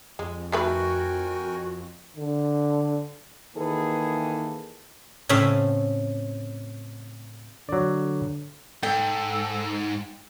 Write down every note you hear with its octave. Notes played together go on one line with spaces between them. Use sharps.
F2 G#3
D#3 A3 F#4 A#4 B4 G5 G#5
D3
D#3 E3 A#3 G#4 A4 B4
A2 C#3 C4 C#4 E5 F5
D3 F#3 D5
G#2 A4 G5